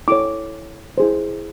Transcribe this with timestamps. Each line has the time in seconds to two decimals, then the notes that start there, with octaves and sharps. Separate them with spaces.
0.08 E4 A4 C#5 D6
0.98 E4 G#4 C5